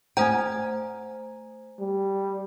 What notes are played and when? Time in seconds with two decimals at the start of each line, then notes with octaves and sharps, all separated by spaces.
0.17 A3 C5 G5 G#5 A#5
1.80 G3